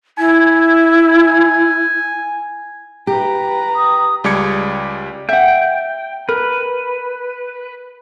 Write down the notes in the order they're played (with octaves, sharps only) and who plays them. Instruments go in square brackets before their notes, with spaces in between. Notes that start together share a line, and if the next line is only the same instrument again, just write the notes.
[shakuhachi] E4 [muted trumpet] G#5
[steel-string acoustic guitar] G4 [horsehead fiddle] B4 A#5
[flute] D#6
[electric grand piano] C#2 G3 G#3 D6 G#6 C#7
[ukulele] E5 F#5 [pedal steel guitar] G5
[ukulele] A#4 [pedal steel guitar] B4